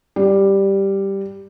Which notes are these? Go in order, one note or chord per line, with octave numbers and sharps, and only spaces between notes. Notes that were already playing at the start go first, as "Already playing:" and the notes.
G3